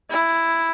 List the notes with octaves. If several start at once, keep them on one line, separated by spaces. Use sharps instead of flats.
E4